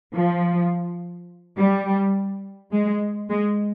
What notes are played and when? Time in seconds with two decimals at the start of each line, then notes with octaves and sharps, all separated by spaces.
0.15 F3
1.58 G3
2.72 G#3
3.29 G#3